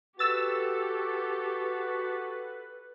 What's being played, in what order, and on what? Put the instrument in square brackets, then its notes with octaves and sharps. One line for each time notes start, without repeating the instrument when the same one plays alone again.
[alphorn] F#4 [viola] G4 A4 [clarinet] B4 [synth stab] E6 A6